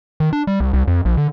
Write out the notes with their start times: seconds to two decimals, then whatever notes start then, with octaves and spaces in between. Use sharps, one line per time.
0.20 D#3
0.33 D4
0.47 G3
0.60 C2
0.73 C2
0.87 F2
1.05 A#1
1.17 D3